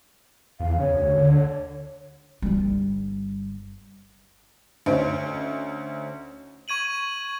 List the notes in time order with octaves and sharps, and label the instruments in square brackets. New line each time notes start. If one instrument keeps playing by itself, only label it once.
[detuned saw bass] E2 [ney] F5
[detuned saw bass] C#3 [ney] C#5
[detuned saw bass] D2
D3
[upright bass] G1 G3
[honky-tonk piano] D2 C#4 D#4 C5 D7
[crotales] C#6 G#6 D#7 F#7